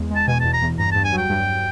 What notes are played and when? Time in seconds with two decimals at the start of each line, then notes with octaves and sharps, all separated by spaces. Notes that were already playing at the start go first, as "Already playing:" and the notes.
Already playing: E2 E3 G#3
0.10 G#3
0.15 A5
0.27 B2 G#5
0.40 E2 A5
0.53 A#5
0.62 E2
0.79 G2 A#5
0.92 G2 A5
1.04 G#5
1.12 F#3
1.18 G5
1.30 G2